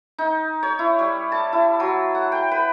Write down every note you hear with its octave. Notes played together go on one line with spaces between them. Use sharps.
D#4
C#5
E4
G3
A5
E4
F#3
F#5
G5
B4